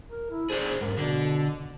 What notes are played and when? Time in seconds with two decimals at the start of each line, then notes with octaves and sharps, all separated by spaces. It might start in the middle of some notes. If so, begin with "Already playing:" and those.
0.10 A#4
0.31 E4
0.50 D4 G#4 C5
0.81 B1 G#2 A#4
0.98 B2 D3 D5